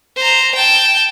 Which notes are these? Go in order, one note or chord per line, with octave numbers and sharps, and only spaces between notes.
C5 A#5
G5 A5